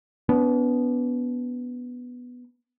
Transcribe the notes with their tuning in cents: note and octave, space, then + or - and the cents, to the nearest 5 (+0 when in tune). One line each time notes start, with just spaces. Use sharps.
B3 +0 D4 -40